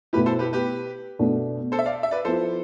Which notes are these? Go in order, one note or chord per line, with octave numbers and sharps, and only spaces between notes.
B2 A3 E4 G4 B4
A4 C5
G4 B4
G4 B4
B2 A3 D4 A4
A4 C5
E5
D5 F5
E5
B4 D5
F3 B3 E4 A4 C5